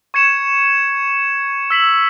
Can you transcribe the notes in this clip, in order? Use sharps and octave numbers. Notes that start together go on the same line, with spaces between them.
C#6 G#6 C#7 E7
E6 B6 F#7